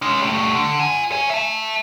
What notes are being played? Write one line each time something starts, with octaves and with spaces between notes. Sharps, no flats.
G#3 C#4
G3 A3
D3
F4 G#5
C#5 G#5
E5 A5